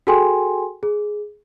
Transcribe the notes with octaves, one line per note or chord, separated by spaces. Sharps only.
F#4 G#4 A4 G5 G#5 C6
G#4